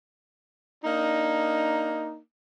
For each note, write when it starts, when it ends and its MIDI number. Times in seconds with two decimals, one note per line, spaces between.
0.85 2.19 58
0.85 2.19 62
0.85 2.19 63